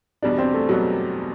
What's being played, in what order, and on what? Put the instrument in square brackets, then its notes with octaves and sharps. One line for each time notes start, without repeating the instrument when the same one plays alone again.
[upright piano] E2 B2 G3 [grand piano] D4
[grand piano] C4
A3
[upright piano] B2 G3 [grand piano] F#3